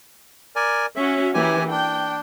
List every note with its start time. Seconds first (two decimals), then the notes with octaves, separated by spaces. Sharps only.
0.56 A#4 D5 G#5
0.96 C#4 F#4 E5
1.34 E3 A#3 E4 G4 G#5
1.70 D4 G5